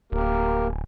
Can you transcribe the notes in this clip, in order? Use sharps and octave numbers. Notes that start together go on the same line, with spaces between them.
D1 A#3 G4 A#4